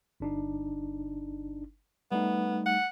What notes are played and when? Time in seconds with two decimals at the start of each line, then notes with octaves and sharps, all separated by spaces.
0.20 G1 D4 D#4
2.12 G3 A3 B3 D#4
2.66 F#5